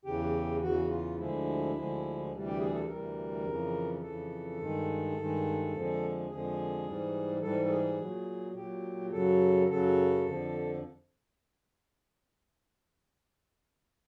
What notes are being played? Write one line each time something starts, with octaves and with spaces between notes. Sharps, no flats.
E2 C#3 E3 G4
E2 C#3 E3 F#4
F4
D2 D3 F3 G#3 E4
D2 D3 F3 G#3
D2 C3 E3 G3
G4
G#4
A4
D2 C3 E3 G3 A#4
F2 C#3 E3
F2 C#3 E3 A4
G2 D#3 G#3
G2 D#3 G#3
F2 D3 F3 G#3
F2 D3 F3 G#3 G#4
G#2 E3 G3
G#2 E3 G3 A4
A4
G#4
A#2 F#3
A#2 F#3 G4
F#2 C#3 F#3 A4
F#2 C#3 F#3 A4
F2 D3 F3